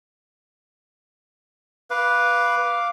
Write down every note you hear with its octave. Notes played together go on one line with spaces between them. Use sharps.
B4 F5 D6